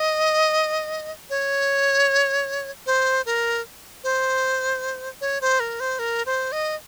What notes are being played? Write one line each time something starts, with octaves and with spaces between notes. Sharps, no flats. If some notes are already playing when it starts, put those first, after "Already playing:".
Already playing: D#5
C#5
C5
A#4
C5
C#5
C5
A#4
C5
A#4
C5
D#5